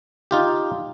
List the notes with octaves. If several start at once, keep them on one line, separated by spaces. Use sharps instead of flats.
D#4 F4 G4